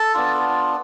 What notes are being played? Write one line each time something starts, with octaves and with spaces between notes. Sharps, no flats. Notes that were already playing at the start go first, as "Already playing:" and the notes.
Already playing: A4
B3 D4 F4